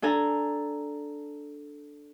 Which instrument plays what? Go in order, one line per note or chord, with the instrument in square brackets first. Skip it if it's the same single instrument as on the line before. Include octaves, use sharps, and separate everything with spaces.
[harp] D4 A4 G#5 A#5